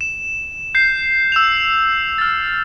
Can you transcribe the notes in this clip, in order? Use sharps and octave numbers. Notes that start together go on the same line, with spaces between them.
E7
G6 C7
E6 E7 F7
F6 A6